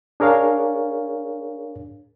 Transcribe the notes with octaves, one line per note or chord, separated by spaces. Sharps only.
D4 G#4 A#4 C#5 F5